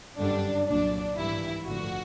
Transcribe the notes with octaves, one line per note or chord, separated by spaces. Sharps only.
G1 F#2 D3 G3 D4
C2 A#2 F#3 D4
G#1 G2 E3 G3 E4
A1 G2 D3 F3 F#4